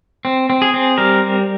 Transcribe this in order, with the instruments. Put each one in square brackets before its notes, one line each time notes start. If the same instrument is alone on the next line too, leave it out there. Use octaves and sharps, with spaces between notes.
[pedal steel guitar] C4
C4
G#4
C4
G3 A#4